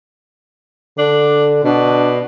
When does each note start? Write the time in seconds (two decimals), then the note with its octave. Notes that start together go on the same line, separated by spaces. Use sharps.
0.98 D3 D4
1.64 B2 D4